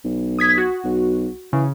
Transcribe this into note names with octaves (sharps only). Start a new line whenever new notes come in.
B1
D#6 G#6 B6
F#4
B1
C#3 E3